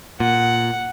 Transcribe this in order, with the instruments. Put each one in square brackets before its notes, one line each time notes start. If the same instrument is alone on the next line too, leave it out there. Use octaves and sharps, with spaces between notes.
[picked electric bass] A#2 [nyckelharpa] F#5